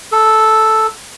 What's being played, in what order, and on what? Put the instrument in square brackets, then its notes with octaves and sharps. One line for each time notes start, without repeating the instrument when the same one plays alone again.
[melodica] A4